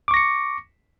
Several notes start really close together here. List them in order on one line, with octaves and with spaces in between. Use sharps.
D6 C#6 A#6 C#7